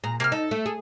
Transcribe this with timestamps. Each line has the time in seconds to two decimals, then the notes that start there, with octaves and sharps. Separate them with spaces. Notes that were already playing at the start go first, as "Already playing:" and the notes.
0.04 A#2 G#4 A#5
0.20 C3 A#3 A5 F6
0.32 D#4 A4
0.51 A3
0.66 G#4